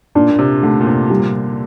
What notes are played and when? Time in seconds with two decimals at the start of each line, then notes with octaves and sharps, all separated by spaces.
0.15 A#2 D4
0.31 A#2
0.39 C3
0.63 D3 A3
0.81 A#2
0.87 C3
1.10 A#2 G3
1.20 C3
1.29 A#2